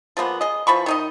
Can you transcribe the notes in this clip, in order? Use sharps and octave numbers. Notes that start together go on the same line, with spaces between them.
F3 G#3 A#3 B3
G#4 D#5
E3 F3 B5 C#6
D#3 D#4 D#5